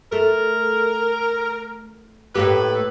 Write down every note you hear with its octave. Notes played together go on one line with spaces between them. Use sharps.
A3 A#4
A2 A#3 G4 A4 B4